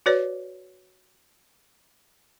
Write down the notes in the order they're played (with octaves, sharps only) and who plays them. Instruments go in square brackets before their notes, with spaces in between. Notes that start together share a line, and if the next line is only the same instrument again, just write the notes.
[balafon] F#4 B4 C#5 D5